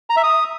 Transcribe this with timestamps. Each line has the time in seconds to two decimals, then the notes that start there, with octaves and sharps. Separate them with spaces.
0.10 A#5
0.17 E5
0.23 D#6